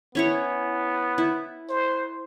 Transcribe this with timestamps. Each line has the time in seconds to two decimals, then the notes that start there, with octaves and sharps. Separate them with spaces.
0.15 B3 C#4 E4 C#5
1.18 E4
1.69 C5